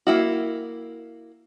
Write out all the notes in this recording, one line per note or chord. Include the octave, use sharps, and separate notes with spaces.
A#3 E4 F#4